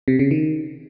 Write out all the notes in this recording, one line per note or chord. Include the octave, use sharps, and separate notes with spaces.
C3
C#3
D#3